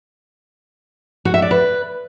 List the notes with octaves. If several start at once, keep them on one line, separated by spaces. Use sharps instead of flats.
F#4
E5
D5
B4